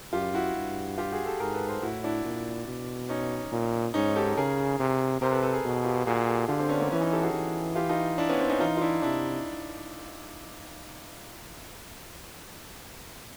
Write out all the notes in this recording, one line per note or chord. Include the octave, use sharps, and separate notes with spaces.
F#2 F4 G4
E4 F#4
G2
F4 G4
F#4 G#4
G4 A4
G#2 G#4 A#4
A4 B4
A#4 C5
A2 E4 F#4
D4 E4
A#2
B2
C#4 D#4
A#2
G#2 C#4 D#4
G4 A4
C#3 G#4 A#4
C3
C3 A#4 C5
A4 B4
A4 B4
G#4 A#4
B2
F4 G4
A#2 F#4 G#4
G4 A4
D3 F4 G4
C4 D4
B3 C#4
A#3 C4
E3 B3 C#4
C#4 D#4
G4 A4
F#4 G#4
E3
F4 G4
D#4 F4
D4 E4
B3 C#4
C4 D4
C#4 D#4
E3 D#4 F4
F4
D4 E4
C3 D4 E4